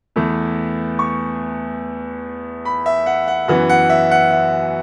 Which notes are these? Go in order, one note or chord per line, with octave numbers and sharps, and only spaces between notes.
E2 E3 A3
C#6
B5
E5
F#5
F#5
F#2 E3 B3 F#5
F#5
E5
F#5
E5